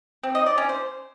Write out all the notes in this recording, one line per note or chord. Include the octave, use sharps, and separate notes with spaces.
C4
D#5
D5
C#4
C5